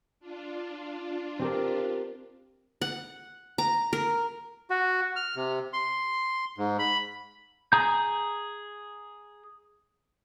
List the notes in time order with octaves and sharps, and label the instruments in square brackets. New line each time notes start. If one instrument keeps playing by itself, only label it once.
[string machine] D4 F4
[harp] C4 G4 A#4
[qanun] F#5
A#5
A#4
[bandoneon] F#4
F6
C3
C6
G#2
B5
[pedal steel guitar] G#4 A#5 G6